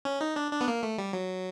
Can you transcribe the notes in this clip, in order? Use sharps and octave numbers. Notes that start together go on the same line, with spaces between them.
C#4
D#4
D4
D4
B3
A#3
A3
G3
F#3